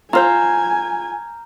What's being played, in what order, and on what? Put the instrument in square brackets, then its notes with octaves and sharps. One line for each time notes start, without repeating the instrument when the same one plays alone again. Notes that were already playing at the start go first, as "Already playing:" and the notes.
[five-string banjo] F4 C5 [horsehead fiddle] G#5 [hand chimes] A#5 F6 G6